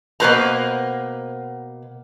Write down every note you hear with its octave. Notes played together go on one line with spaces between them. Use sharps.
B2 A#3 G4 B4 C5 A#5